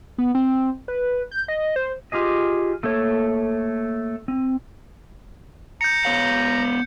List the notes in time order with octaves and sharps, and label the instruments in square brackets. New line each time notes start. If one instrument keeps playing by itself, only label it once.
[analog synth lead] B3
C4
B4
G6
D#5
C5
[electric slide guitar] F4 G4 G#4 D#5
A3 A#3 A4 C#5
C4
[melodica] A#5 [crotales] G6 C#7
[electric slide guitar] B3 C#5 F5